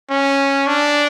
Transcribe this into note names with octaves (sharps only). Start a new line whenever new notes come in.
C#4
D4